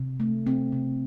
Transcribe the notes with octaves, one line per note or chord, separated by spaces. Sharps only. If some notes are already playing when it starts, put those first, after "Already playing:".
Already playing: C3
A3
C3 C4
C3